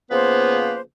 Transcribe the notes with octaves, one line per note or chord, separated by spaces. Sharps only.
C#3 F3 A#3 B3 B4 C5